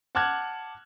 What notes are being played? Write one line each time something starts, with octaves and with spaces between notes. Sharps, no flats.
F#5 A5 D6 F6 F#6 G#6